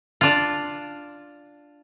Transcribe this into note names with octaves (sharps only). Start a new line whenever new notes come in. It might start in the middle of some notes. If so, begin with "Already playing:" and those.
D4 F4